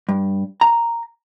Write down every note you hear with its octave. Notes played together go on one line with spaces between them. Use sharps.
G2
A#5